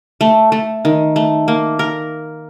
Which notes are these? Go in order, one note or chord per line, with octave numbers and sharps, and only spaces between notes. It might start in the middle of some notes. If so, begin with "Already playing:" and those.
A3
A3
D#3
A3
A#3
A#4